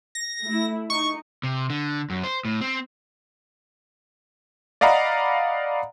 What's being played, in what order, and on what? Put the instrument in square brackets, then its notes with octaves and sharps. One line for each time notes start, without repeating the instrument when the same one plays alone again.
[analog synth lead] A#6
[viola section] A3 E4
[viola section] D#4 [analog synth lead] C#6
[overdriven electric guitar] C3
D3
F#2
C5
A2
C4
[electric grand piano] D5 D#5 F5 F#5 A#5 B5